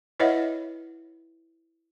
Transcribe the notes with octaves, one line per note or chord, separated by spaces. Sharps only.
E4 B4 C#5 D#5 E5 F#5